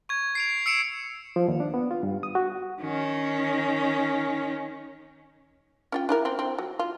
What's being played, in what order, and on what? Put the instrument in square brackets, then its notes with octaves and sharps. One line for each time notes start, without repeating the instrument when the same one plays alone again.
[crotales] C#6 G#6
C7 D7 F7
E6 C#7 D7 E7 F7
[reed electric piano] F3
D#2
D4
B3
F4
G2
D#6
F#4
[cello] D#3 C#4
[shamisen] C#4 F4 G5
D4 E4 A#4
C4
C4
F#3
F4